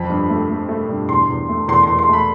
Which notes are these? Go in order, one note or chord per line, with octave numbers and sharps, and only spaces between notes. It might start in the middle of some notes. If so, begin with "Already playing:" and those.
Already playing: F2 F3 B5
G2
A3
A3
A3
G2
E2 C6
E2
A3
E2 C6
C6
E2
C6
A3 B5